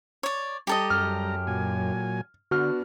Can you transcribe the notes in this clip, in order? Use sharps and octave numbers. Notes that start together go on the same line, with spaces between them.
C#5 D5
G3 G4 A4 D#5 A#5
F#2 F6
A#2 F#3 G#5
D3 B3 D4 F#4 F6